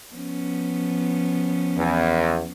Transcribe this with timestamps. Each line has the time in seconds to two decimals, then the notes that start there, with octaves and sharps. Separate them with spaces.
0.14 F3 B3 C#4
1.76 E2